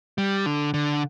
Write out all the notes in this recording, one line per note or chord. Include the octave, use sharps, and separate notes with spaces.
G3
D3
D3